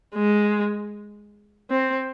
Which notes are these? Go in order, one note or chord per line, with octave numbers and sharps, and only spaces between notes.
G#3
C4